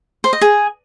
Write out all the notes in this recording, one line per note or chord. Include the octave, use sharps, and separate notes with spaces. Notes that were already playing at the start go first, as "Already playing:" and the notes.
C5
D#5
G#4